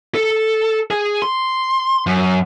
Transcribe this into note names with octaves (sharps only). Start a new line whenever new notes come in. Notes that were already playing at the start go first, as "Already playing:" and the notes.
A4
G#4
C6
F#2